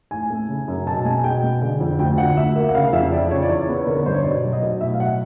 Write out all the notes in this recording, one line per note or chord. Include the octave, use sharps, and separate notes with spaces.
A2 G#5
A3
C#3
F#2
B2 A5
G#3 G#5
B2 G5
G#3
D3
F2
D2 G5
D3 F#5
D2 E5
A#3 E5
F#5
C#3 F5
F2 E5
E2 D5
C#3 C#5
D5
E2 C#5
B3
D3 A#4
B4
G2 C5
C#5
B2 D5
F#3
D#5
B2
A2 E5
F5
F#3 F#5